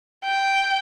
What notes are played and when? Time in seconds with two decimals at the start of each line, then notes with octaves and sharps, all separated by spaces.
0.24 G5